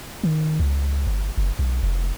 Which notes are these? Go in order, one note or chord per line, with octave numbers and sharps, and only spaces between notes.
D#3
C#2
G1
F#1
B1
F1